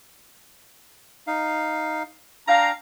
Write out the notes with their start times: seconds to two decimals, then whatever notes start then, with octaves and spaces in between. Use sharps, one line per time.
1.27 D#4 F5
2.48 D4 F5 G5 A#5